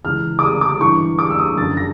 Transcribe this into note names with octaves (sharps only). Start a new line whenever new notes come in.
C#2 C#3 E3 F6
D6
D#6
D6
G2 E3 C#6
D6
E6
D#6
F#2 D3 F3 A6
A#6